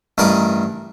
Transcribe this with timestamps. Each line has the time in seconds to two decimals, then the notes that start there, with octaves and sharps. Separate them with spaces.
0.18 A1 G2 A#4 B4 D#5 D6